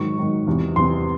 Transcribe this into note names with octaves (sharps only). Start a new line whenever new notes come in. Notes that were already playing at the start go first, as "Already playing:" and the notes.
Already playing: G#2 D#3 F#3 C#6
G#2 D#3 F#3
E2 C3 E3
E2 C3 E3 C6